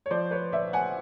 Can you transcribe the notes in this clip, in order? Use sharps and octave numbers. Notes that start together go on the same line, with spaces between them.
C#5
F3 C5 D5
B4 C#5
A#1 D5 E5
F#5 G#5